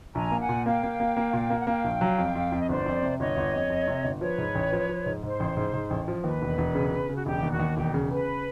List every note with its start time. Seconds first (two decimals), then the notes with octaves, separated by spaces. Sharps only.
0.15 A#1 G#5 A#5
0.31 A#3
0.41 F#5 G#5
0.49 A#2
0.66 A#3 F5 G5
0.83 A#3
1.00 A#3
1.17 A#3
1.33 A#2
1.50 A#3
1.59 F#5
1.67 A#3 F5 G5
1.84 A#1
2.01 F#3
2.18 F2
2.35 F2
2.52 F2
2.62 D#5
2.69 G1 C5 D5
2.86 F2
3.03 C3
3.19 G1 C#5 D#5
3.37 G1
3.54 F2
3.70 F2
3.88 C3
4.05 G1
4.21 F3 B4 C#5
4.38 G#2
4.55 A1
4.72 F3
4.89 F3
5.06 G#2
5.23 G#2 C5
5.40 A1
5.57 G#2
5.73 G#2
5.90 A1
6.08 F3
6.24 D#2 B4
6.42 E1
6.58 E1
6.75 C#3
6.92 C#3
7.09 C#3
7.16 F#4
7.26 E1 G4
7.43 D#2
7.51 F#4
7.60 D#2
7.76 E1 G4
7.94 C#3
8.10 C#3 B4